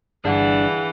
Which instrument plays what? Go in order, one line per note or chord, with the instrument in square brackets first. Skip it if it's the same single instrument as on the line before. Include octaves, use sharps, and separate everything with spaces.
[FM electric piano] G1 G2 [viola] E3 [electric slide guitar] D4 [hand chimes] G#4 F5 F#5